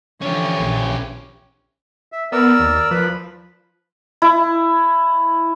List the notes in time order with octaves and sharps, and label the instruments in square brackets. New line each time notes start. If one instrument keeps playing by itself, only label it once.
[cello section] D3 E3 F3 [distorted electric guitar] C#4 G4 [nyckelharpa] C#5
[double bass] A#1
[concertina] E5
[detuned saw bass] B3 [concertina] A#4 D5 E6
[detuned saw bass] D#2
[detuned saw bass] F3 [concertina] B4 B5
[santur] E4